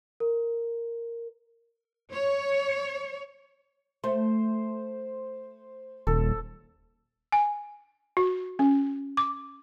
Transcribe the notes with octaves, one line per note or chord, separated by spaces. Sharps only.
A#4
C#5
A3 C5
D#1 A4
G#5
F#4
C#4
D6